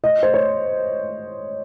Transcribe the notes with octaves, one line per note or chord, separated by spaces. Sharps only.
D#5
C5
C#5